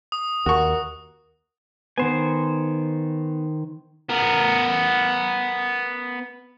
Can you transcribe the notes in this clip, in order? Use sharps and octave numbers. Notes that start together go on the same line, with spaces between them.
D#6
D#2 F#4 A#4 C#6
D#3 B3 C5 G#5
B3 A#4